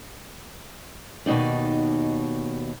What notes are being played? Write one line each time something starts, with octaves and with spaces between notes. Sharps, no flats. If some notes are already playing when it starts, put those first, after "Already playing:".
D#2 B2 E3 D#4 D5